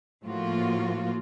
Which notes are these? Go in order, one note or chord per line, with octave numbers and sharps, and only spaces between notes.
A2 F3 A#3 F4 F#4